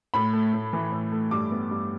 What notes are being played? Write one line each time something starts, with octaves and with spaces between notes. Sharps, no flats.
A2 B5
A3
A2
E3
A2
A3
G2 D6
B3
G2